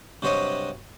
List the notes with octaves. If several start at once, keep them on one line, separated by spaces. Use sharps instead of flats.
G2 C3 F#3 C5 C#5 D#5